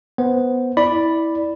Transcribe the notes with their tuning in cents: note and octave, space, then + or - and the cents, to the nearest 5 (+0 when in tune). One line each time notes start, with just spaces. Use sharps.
B3 +0 C5 +0
E4 -20 D5 +0 B5 +0